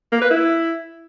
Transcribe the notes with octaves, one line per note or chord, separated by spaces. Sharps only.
A#3
B4
E4